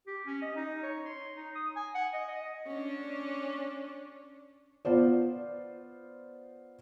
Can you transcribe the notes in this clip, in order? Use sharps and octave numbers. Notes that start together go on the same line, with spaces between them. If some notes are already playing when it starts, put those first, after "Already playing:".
G4
C#4
D#5
D#4
C#5
C6
D#4
D#6
G#5
F#5
D#5
D#5
C#4 D4
B3 F4 C5 D5